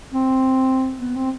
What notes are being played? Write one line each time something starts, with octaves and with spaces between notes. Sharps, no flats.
C4
B3
C4